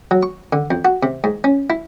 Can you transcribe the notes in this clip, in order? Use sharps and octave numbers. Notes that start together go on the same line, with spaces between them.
F#3
C#6
D3
F2
F#4
C3
G#2
C#4
E4